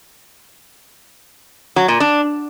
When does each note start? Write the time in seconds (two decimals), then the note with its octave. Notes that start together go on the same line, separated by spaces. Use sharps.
1.76 F#3
1.88 A#2
2.00 D4